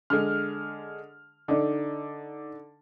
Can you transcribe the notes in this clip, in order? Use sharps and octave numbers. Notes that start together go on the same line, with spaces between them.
D3 G#3 F6
D3 D#4 D5